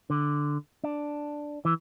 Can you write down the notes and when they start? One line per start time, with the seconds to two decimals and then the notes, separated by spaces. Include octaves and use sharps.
0.10 D3
0.84 D4
1.65 E3